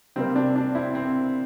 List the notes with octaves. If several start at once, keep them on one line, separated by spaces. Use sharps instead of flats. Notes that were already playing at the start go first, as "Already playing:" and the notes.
C3 G3 A#3 C4
D4
D4
C4 E4
C4